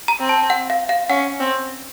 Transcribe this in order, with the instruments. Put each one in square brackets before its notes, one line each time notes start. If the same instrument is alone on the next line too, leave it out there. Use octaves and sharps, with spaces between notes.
[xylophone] A#5
[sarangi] C4
[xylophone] A5
F#5
F5
F5
[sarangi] C#4 [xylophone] F#5
[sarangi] C4